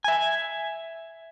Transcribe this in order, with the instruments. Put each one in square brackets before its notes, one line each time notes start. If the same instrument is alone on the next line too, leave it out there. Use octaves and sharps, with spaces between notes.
[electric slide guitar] E5 G#5